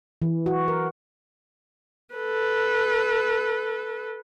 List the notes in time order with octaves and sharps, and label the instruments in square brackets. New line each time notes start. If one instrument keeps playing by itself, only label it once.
[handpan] E3
F#4
A#4
[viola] A4 B4